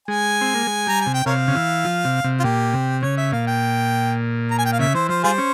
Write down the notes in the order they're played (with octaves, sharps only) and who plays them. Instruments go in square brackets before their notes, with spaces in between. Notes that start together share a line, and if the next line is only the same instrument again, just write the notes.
[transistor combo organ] G#3 [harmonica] G#5
[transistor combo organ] C4
A#3
G#3
[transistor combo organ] G3 [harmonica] A#5
[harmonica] G#5
[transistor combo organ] C3
[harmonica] G5
[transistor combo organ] C3 [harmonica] A#4 C#5 F5
[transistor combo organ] C#3
E3
F3
C3
C3
[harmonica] F4
[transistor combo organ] A#2 [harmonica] G4
[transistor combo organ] C3
[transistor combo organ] C#3 [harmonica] C#5
[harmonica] E5
[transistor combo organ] A#2 [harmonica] F5
[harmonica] G5
A#5
G#5
G5
F5
[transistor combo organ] C#3 [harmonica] E5
[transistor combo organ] E3 [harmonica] C5
[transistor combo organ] F3 [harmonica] C5
[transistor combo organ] G3 [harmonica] F4 G#4 C5
[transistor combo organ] C#4